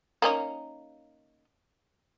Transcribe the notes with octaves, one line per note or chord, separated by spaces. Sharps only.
A#3 C#4 D#4